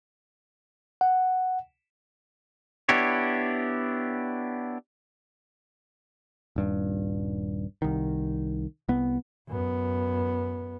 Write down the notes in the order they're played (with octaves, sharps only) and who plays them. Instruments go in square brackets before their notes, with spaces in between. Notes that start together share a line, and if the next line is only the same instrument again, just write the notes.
[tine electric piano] F#5
[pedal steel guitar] B3 D4 E4 G4 C#5
[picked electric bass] D#1 G2
C2 D#3
C2 B3
[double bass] F#2 B3